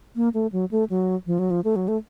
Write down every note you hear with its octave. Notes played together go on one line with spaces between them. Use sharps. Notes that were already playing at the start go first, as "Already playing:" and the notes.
A#3
A3
F#3
A3
F#3
F3
F#3
F3
A3
F#3
A3